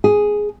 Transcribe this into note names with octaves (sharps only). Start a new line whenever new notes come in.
G#4